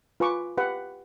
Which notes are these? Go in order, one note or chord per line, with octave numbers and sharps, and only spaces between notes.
F4 B4 G#5 B5 C#6 D6
G4 B4 F5 F#5